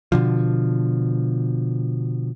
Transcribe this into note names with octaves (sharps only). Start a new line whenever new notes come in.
B2 D3 F3